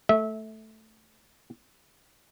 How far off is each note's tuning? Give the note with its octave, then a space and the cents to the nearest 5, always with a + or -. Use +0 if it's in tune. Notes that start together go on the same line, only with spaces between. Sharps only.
A3 +0 E5 -20